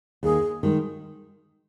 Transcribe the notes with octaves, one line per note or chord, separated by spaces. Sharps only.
D#2 G#4
D#3 G#3